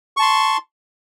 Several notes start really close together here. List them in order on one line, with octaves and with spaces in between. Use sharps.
C#6 A5 C6